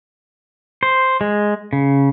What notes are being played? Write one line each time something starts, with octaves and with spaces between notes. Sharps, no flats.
C5
G#3
C#3